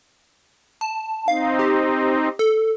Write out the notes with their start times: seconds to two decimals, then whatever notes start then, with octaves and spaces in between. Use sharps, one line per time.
0.81 A5
1.28 C4 D#4 F5
1.59 G4
2.39 A4